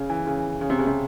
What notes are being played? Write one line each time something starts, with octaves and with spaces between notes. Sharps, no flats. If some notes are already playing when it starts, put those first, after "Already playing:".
Already playing: C#3
E3
C#3
C#3
C3
C#3
C3